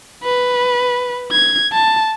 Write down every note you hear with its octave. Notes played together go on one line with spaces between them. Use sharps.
B4
G#6
A5